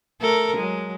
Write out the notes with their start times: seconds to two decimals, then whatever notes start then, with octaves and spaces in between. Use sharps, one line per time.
0.21 A3 A4 A#4
0.55 F#3 G#3